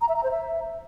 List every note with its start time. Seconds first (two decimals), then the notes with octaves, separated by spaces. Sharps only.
0.01 A#5
0.09 E5
0.16 A#5
0.23 C5
0.31 E5